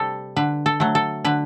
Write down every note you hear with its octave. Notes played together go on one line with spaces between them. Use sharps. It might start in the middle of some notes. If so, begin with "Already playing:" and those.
Already playing: C3 G3 A4
D3 B4
A4
F#3 A3
A4
D3 B4